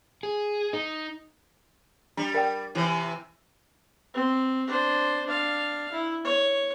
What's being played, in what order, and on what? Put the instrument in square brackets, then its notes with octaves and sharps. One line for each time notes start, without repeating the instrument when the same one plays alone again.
[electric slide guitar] G#4
D#4
[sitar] G3 [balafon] D4
[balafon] A#4 D5 G5
[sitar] C3 E3
[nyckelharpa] C4
D4 C5
D4 F5
E4
C#5